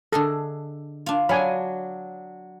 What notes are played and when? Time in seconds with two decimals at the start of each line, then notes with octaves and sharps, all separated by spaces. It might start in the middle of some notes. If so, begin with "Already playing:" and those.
0.13 D3 G#4 A4 D#5
1.06 D4 F4
1.29 F#3 D4 F5 G#5 B5